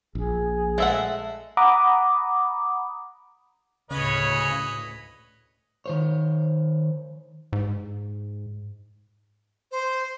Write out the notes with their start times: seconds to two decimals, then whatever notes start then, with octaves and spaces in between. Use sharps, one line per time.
0.15 A#1 G#4
0.78 G#3 A3 E5 F#5
1.57 F#5 A#5 B5 D6 D#6
3.91 D2 A2 C#3 B4 C#5 D#5
5.86 D#3 C5 C#5
7.53 G#2
9.71 C5